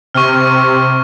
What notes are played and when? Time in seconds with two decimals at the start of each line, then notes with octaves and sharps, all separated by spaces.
0.14 C3 C#6 F6